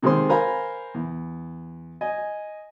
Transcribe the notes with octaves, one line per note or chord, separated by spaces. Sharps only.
C3 D#3 G#3 C4 C5 C6
A#4 C5 F5 G#5 A#5 B5
E2
D#5 G#5